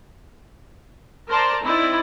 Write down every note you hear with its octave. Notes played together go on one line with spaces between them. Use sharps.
A#4 C5 D5 A5 A#5 C6
C4 D#4 E4 D5